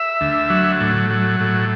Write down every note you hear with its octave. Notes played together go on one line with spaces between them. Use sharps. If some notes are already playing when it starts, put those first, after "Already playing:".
Already playing: E5
D2
F#3
A2
F#3
A2